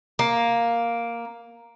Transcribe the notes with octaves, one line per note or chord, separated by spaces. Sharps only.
A#3